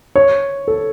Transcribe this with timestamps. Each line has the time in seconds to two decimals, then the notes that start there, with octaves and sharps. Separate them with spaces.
0.16 C#5
0.68 A4